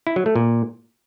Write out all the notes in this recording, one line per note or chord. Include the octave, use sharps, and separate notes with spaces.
E4
F#3
A3
A#2